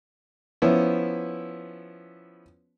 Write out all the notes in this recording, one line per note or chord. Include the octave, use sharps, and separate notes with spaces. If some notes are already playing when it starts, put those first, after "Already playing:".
F3 B3 C#4 E4